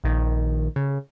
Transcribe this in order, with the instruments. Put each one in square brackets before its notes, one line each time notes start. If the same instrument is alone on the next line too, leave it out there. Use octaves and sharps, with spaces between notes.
[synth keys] A#1 D#3
C#3